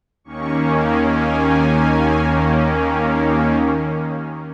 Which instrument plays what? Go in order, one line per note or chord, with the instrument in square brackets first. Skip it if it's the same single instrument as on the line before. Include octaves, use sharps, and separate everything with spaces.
[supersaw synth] D#2 D#3 A#3 C#4 C#6
G#5
G#5